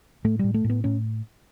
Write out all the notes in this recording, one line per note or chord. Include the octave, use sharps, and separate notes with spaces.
A2 A3
A2 G3
A3
A2
B3
A2 C#4